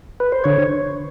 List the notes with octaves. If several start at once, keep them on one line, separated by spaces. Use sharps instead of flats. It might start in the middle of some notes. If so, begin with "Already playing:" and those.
B4
C5
D3 C#5